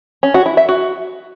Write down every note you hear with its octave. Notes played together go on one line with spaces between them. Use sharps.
C#4
F#4
E4
E5
F#4